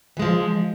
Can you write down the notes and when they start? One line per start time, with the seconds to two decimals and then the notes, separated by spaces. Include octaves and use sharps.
0.17 E3
0.19 G#3
0.22 F3